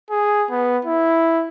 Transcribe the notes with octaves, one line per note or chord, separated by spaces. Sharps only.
G#4
B3
E4